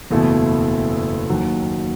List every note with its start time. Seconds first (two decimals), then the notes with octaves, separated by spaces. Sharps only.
0.11 F#1 E2 B2 A3 E4
1.30 D#2 D#3 F#3